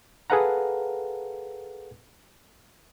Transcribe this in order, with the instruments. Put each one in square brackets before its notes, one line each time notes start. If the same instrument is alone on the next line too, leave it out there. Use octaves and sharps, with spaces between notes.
[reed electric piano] G#4 A4 B4 F5 F#5 A#5